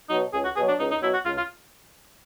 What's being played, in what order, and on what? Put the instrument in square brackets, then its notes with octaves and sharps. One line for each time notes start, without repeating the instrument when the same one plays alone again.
[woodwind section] B2 F#3 [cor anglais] D#4
[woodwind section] C#2 [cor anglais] G#4
[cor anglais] F#4
[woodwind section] B2 [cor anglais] G#4
[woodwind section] F#3
[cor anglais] D4
[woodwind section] C#2 [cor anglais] D#4
[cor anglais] D#4
[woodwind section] B2 F#3 [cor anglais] E4
[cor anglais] F#4
[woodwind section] C#2 [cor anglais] F4
[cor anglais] F4